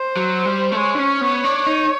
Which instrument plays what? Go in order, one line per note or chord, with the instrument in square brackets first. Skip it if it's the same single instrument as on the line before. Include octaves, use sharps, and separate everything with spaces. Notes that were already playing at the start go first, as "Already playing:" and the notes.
Already playing: [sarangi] C5
[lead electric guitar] F#3
G3
A3
[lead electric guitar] G#3 [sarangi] C#5
[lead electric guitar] D4
C#4
B3
D4
D#4